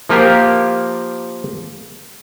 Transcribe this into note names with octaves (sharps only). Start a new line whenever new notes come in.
F3 A#3 F4 G4 A#4